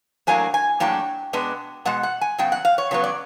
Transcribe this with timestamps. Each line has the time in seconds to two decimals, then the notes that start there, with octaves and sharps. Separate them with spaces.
0.27 A2 F#3 A#3 D4 G#5
0.54 G#5
0.80 A2 F#3 A#3 D4 G5
1.33 B2 G#3 B3 D4
1.85 B2 G#3 F#5
2.03 F#5
2.21 G#5
2.38 C#3 F#3 B3 G5
2.52 F#5
2.65 F5
2.78 C#5
2.91 C#3 F#3 B3 C#5
3.04 D5